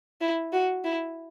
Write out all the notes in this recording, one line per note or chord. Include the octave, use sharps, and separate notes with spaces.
E4
F#4
E4